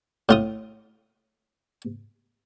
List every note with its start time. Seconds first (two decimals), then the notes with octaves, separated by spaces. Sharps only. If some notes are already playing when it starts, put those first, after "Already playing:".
0.29 A2 F4 D#6